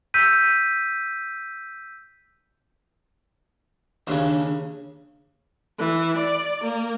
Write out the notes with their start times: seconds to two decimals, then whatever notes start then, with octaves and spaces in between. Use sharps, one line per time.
0.14 E6 G6 B6 D#7
4.07 D#2 C#3 D4
5.78 E3
6.18 D5
6.65 A#3